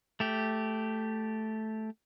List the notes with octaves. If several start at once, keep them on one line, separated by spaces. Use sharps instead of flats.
A3 G4